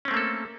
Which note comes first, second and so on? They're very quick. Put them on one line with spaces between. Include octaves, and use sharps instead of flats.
C#4 C4 A3 A#3 A4